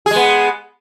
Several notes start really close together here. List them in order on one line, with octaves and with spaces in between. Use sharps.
G#4 G#3 B3